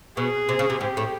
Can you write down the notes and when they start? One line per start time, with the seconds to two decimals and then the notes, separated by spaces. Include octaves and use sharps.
0.17 B2 G#4
0.49 C3
0.59 C#3
0.70 C3
0.81 G#2 G4
0.97 A2